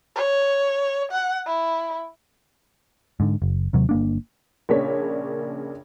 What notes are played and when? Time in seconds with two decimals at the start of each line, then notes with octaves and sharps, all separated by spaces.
0.15 C#5
1.11 F#5
1.46 E4
3.20 G#2 D3
3.42 F#1
3.73 D#2 C3 F#3
3.89 G1 A#3 D4
4.69 A#1 C#3 A#3 D4 C#5 B6